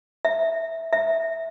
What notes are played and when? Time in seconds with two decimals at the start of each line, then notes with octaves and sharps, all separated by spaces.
0.25 E5
0.93 E5